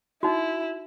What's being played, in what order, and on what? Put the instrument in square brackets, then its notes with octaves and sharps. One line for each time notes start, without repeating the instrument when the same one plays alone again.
[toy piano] D#4 F#4 [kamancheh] E4